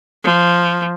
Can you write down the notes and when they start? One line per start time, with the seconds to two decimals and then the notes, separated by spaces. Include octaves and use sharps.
0.24 F3